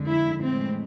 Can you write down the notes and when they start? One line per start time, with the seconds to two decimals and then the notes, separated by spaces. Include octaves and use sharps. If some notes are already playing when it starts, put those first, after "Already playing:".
Already playing: F2 D3 G#3
0.10 E4
0.42 A2 E3 G#3 C4